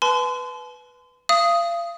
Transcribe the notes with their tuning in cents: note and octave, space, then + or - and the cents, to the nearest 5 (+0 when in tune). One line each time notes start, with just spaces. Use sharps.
B4 +0 A5 -45 C6 -35
F5 -35 D#6 +5